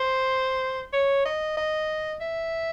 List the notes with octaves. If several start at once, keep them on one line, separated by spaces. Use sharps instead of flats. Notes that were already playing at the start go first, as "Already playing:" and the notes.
Already playing: C5
C#5
D#5
D#5
E5